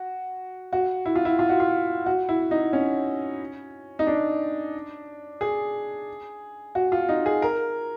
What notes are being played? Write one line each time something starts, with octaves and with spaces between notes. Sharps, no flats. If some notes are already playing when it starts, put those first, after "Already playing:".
Already playing: F#4
F#4
E4
F4
E4
F4
F#4
F4
F#4
E4
D#4
C#4
D#4
D4
G#4
F#4
F4
D#4
G#4
A#4